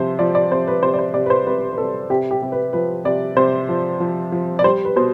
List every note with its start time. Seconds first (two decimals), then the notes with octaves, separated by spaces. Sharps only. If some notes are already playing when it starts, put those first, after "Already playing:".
Already playing: C3 F3 C5
0.19 F3 D5
0.35 D5
0.51 C3 C5
0.67 B4
0.83 C3 C5
0.94 D5
0.99 C5
1.14 C3 D5
1.26 B4
1.30 C5
1.47 C3 B4
1.72 B4
1.78 C3 A4
2.10 C3 G4
2.31 G4
2.42 C3
2.52 B4
2.73 F3 B4
3.05 C3 D5
3.36 C3 C5
3.69 F3
4.00 F3
4.32 F3
4.59 D5
4.64 G3 C5
4.85 B4
4.96 B2 C5